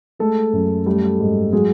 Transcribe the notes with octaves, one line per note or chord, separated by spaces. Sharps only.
G#3 A3 A4
F#2
G3 A3 A4
G#2
F#3 G#3 G#4